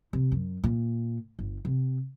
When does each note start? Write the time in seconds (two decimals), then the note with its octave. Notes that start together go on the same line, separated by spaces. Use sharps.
0.13 C3
0.32 F#2
0.64 A#2
1.39 G1
1.65 C3